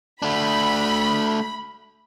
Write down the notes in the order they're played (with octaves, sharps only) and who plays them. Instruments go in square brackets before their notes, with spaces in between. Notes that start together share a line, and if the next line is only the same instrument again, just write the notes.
[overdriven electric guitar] A3 D4 [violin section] B5